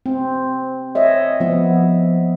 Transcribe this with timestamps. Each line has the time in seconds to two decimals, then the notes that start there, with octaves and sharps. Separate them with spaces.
0.06 C4
0.95 C#5 D#5 E5
1.40 F3 B3